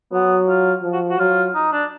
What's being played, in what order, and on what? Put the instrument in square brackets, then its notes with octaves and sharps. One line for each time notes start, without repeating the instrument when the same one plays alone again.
[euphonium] F#3 [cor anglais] B3
[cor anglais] F4
[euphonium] F3
[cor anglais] F#4
F#4
[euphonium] F#3 [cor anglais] F4
[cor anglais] D#4
D4